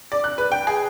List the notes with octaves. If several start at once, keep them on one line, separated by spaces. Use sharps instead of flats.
D5
F#6
B4
G5
G#4